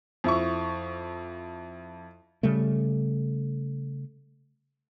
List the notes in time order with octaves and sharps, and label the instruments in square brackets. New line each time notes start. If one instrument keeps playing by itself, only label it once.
[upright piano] F2 E4 C#6
[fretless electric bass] C#3 G3 A3